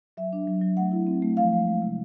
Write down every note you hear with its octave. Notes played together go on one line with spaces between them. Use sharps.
F#3 E5
D4
F#3
F#3
A3 F#5
E4
C4
A3
F3 F5
G#3
G#3
C3